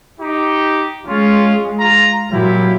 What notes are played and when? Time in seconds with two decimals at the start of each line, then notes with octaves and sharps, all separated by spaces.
0.20 D#4 G4
1.06 G#3 C#4 F4
1.80 F4 A#5
2.32 A#2 F#3 E4 F4 G4